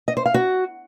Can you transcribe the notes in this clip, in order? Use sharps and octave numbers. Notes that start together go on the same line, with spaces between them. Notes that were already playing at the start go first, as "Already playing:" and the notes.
D#5
C5
F5
F#4